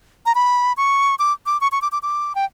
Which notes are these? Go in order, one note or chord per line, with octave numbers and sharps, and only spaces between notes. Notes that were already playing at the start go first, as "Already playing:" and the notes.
A#5
B5
C#6
D6
D6
C#6
C#6
D6
D6
D6
G5